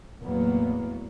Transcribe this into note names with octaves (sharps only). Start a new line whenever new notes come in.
E2 A2 F#3 A#3 B3